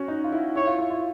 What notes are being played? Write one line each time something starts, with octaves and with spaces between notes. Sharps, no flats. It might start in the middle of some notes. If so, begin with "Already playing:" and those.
Already playing: C#4 F#4
D#4
F4
E4
E4 C#5
F4
E4
F4